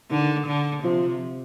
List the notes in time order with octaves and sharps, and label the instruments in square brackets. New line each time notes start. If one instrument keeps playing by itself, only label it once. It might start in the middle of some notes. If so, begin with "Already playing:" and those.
[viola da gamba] D3 [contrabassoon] D#3
[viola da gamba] D3
[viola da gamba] C3 [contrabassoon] F3